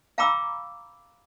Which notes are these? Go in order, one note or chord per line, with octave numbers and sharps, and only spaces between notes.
F5 G5 A#5 B5 D6 E6